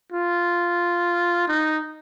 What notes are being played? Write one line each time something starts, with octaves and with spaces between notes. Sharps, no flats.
F4
D#4